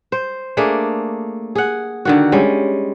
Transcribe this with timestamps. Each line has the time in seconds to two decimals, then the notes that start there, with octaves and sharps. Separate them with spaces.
0.12 C5
0.57 A3 A#3 D4 G#4
1.55 G#4 F#5
2.05 D3 D#3 F#4
2.32 G3 G#3 C#4